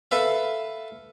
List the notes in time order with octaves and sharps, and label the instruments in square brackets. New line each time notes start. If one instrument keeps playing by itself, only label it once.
[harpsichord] A4 B4 E5 F5